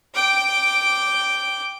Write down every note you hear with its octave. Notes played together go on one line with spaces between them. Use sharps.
G5 D6